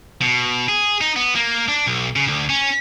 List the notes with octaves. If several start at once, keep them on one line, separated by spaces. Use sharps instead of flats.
B2
G#4
D#4
B3
A#3
D4
B1
C#3
D2
C#4